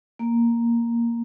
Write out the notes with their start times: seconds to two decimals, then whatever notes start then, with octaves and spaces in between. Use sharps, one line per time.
0.19 A#3